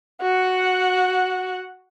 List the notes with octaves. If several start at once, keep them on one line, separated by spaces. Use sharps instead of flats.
F#4 F#5